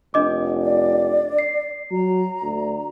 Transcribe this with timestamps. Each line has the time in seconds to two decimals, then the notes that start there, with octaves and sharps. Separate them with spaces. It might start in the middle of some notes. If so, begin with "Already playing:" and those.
0.14 F1 D4 D#5 D6
0.62 D5
1.38 C7
1.91 F#3 A#5
2.43 D2